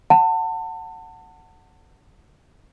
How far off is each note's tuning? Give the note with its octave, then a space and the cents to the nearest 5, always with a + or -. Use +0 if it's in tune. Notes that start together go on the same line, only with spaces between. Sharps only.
F#5 +0 A5 +30